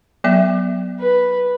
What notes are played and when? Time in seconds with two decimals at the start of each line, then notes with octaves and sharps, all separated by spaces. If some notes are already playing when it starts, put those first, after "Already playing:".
0.24 F#3 B3 E5
1.00 B4